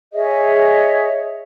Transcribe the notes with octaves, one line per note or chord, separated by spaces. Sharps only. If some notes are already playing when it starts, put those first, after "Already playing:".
G#4 C#5 D#5 E5